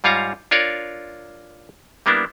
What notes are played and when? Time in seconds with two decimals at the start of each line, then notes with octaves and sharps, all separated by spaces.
0.04 G#2 G3 F4 C#5 F5 A#5
0.51 D4 F4 A#4 C#5 D5
2.06 G3 A#3 B3 D4 E4